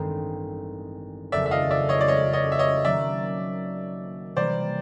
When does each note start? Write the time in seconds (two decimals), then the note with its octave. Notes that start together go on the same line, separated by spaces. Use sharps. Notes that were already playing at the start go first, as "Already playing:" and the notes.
Already playing: A1 G2 D#3 G#3 C4
1.32 F#1 F2 C#3 D5 E5
1.46 E5
1.51 D#5 F5
1.71 D5 E5
1.89 C#5 D#5
2.01 D5
2.08 C#5 D#5
2.33 C#5 D#5
2.52 E5
2.59 C#5 D#5
2.84 D#3 F#3 A#3 C#4 D5 E5
4.36 C3 E3 G3 A#3 C5 D5